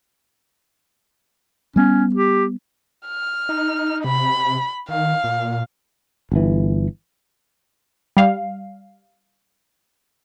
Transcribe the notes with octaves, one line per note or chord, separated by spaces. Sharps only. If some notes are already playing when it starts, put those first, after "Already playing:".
G3 B3 C#4
G4
F6
D#4
C3 B5
D#3 F5
A#2
G1 E3
G3 F5